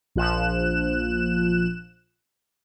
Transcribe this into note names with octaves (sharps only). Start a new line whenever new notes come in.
A#1 F3 F#6 E7